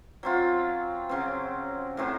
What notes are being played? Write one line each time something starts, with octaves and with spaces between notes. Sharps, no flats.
F#3 C4 F4
C#3 F#3 C4
A2 F#3 C4